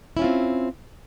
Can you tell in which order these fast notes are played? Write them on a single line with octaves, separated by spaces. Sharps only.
E4 C#4 F4 C4